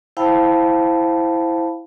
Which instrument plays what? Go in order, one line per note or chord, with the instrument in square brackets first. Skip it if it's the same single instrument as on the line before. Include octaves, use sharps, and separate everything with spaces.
[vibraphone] E4 C5 F5 G5 A5 B5